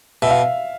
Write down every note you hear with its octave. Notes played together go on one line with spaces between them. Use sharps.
B2 E5
F5